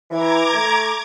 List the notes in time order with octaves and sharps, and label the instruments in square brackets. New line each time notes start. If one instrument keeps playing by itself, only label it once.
[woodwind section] E3 [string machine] A#5 D6 G#6
[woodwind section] A3